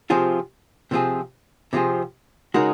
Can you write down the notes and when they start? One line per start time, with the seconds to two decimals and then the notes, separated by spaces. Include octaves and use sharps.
0.10 C3 F3 C4 F4 G#4
0.91 C3 F3 C4 F4 G#4
1.73 C3 F3 C4 F4 G#4
2.54 C#3 G#3 D#4 F#4 A#4